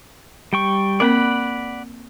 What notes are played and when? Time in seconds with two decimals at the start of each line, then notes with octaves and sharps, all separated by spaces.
0.53 G3 G5 C#6
1.00 A#3 C4 A#4 D5 F#5 B5